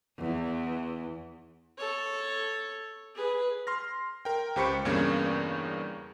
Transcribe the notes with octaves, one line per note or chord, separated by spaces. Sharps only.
E2
A4 C#5
G#4 B4
C6 F6 A#6
A#4 G5
C#2 G4 C5 B5 C#6 C#7
E2 G2 C#3 A#3 G#6